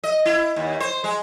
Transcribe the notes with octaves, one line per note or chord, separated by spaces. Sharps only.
D#5
E4
D#2
C5
G#3